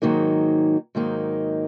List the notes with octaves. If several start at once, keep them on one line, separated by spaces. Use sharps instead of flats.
G#2 D#3 F#3 A#3 D#4
G#2 D#3 F#3 A#3 D#4